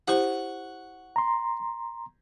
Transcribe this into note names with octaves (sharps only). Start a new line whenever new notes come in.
E4 G4 C5 F#5 C#6
A#5 C6